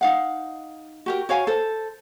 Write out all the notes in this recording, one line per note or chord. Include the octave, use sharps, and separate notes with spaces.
D#4 F5 F#5
F#4 G4 A#4
F#4 C#5 F5 G#5
A4 C5